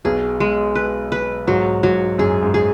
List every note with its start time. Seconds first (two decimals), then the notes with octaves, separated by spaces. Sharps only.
0.05 B1 B2 G#4
0.40 G#3
0.75 B4
1.12 B4
1.47 G#2 F#3
1.83 G#2 F#3
2.18 F#2 G#4
2.43 G#2
2.54 G#4